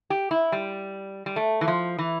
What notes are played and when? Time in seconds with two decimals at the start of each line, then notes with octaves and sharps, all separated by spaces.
0.10 G4
0.31 E4
0.52 G3
1.26 G3
1.36 A3
1.61 E3
1.68 F3
1.98 E3